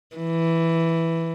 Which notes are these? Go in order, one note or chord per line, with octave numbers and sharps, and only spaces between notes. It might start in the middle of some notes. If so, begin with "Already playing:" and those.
E3